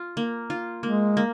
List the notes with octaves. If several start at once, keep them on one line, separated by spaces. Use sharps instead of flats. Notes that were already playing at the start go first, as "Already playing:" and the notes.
Already playing: F4
A#3
F4
G#3 A#3
A#3